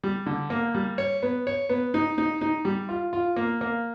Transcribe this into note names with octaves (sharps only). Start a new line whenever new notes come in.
G3
D3
A#3
G3
C#5
B3
C#5
B3
D#4
D#4
D#4
G3
F4
F4
A#3
A#3